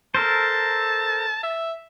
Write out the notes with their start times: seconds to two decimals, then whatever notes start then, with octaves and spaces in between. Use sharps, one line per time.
0.15 A4 A#4 C5 A5
1.43 E5